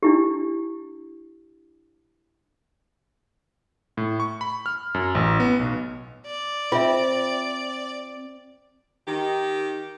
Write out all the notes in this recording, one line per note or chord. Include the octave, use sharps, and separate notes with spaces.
D4 E4 G4
A2
C#6
B5
F6
F#2
A1
B3
B1
D5
C4 F4 E5
D#3 G4